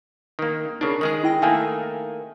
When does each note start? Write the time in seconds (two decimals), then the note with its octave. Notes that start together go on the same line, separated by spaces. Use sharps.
0.39 D#3 A#3
0.81 C#3 D4 D#4 A#4
1.01 D#3 G#3 G#4 F#7
1.24 E4 G5 A#6
1.42 D#3 A3 A#3 F5 G#5